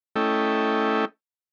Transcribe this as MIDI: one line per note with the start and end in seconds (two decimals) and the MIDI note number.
0.16 1.05 57
0.16 1.05 61
0.16 1.05 64
0.16 1.05 69
0.16 1.05 75
0.16 1.05 79